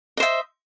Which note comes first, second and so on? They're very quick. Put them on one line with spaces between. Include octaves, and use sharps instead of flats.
D#5 C5 E5